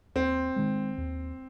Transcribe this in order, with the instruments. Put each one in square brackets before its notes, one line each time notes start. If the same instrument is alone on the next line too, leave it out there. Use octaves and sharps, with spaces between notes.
[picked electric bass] D#2 [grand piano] C4
[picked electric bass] D#3 G#3
D#2